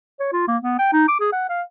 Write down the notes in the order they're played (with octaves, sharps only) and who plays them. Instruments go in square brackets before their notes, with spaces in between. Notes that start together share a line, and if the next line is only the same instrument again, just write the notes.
[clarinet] C#5
F4
A#3
B3
G5
D#4
D6
G#4
F#5
F5